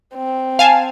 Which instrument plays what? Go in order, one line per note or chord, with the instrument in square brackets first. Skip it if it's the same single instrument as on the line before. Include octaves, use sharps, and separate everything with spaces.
[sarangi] C4
[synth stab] F5 G#5 A5